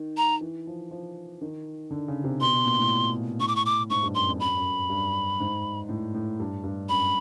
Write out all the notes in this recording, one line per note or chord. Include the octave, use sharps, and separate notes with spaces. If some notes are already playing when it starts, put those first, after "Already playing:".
Already playing: D#3
A#5
E3
F3
F3
D#3
D3
C#3
C3
B2 C6
B2
A#2
A2
A2 C#6
D6
C#6
D6
G#2 C#6
G2
F#2 C6
F2
F#2 B5
F#2
G2
G#2
A2
A2
G2
G2
F#2 B5